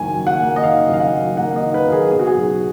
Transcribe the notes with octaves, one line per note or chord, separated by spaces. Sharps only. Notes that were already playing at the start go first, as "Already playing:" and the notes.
Already playing: F#1 D#3 A#3 G#5
F#2
F#5
A#3
D#5
D#3 F5
F#1 F5
F#5
F#2
A#3 F#5
D#5
D#3
B4
F#1 A#4
G#4
B2 G#4
F#4
G#4
B1